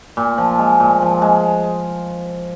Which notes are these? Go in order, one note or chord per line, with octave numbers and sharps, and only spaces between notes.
A#2
F3
G#3
A#2
F3
G#3